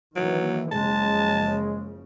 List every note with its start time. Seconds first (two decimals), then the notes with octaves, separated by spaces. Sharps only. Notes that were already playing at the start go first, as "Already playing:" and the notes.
0.16 D#3 E3 F#3 A#3
0.72 F#1 C#3 F3 G#3 A5